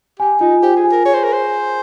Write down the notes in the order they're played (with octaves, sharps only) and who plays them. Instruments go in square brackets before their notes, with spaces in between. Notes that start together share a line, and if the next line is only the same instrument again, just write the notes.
[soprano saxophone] G4 [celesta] G#5
[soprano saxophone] D#4 [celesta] F4
[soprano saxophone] G4 [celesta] C5
[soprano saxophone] G#4
[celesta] G#5
[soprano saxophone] A#4
[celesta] G#4 [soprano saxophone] C#5
[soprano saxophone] C5
[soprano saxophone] A#4 [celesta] G#5
[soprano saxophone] C5
[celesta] G#5